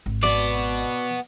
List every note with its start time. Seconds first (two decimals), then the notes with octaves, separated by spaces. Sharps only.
0.06 G#1
0.23 B3 F#4 D5